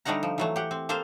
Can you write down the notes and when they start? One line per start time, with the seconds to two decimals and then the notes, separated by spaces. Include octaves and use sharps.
0.05 D3 G3 A3 D#4 F#5 A#5
0.23 F3
0.38 E3 F#3 A3
0.56 G4 F#5
0.71 C4
0.89 A#3 A4 C5 F5